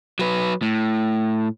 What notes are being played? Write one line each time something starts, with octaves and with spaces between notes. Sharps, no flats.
F#3 B4
A2